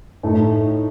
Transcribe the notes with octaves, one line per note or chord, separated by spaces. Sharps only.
A2 A3 D#4